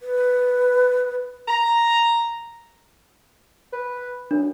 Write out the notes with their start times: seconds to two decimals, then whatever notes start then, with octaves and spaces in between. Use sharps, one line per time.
0.02 B4
1.48 A#5
3.73 B4
4.31 F#2 D4